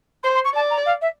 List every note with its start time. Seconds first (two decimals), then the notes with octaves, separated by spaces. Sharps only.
0.23 C5 C6
0.34 C6
0.44 C#6
0.54 D5 A5
0.70 A#5
0.86 F5
1.01 E5